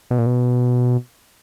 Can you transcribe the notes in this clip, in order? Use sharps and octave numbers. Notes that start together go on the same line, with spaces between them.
B2
A#2
B2